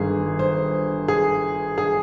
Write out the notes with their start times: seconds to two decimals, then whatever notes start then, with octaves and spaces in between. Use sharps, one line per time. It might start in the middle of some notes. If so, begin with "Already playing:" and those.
Already playing: G1 G2 D#3 G#4
0.39 C5
1.08 G#4
1.78 G#4